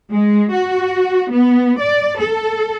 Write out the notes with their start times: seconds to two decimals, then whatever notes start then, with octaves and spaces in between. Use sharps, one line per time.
0.11 G#3
0.51 F#4
1.32 B3
1.80 D5
2.19 A4